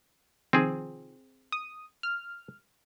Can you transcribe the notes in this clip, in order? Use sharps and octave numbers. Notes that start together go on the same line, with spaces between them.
C3 D#3 F3 C4 G#4
D#6
F6